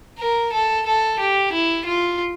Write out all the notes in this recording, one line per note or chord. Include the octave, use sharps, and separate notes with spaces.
A#4
A4
A4
G4
E4
F4